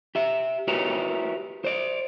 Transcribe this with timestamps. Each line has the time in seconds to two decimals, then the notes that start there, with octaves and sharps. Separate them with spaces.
0.15 G4 E5
0.68 E4 F#4 G4 A#4 B4 C#5
1.64 C5 D5